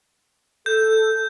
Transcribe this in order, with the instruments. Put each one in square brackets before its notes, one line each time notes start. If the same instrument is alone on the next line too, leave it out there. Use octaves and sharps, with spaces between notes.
[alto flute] A4 [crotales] G6